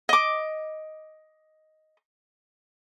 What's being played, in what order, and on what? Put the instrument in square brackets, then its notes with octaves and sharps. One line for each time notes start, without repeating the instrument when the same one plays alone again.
[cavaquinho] D#5 D6